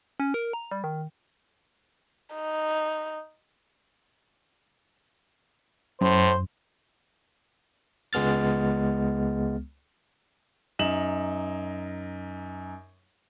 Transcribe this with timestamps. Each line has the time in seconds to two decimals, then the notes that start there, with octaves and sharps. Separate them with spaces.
0.20 C#4
0.34 A#4
0.53 A#5
0.71 G3
0.84 D#3
2.36 D#4
6.01 F#2 A2 C5
8.13 C#2 G#3 B3 F6 A6
10.79 F#2 D#4 E7 F#7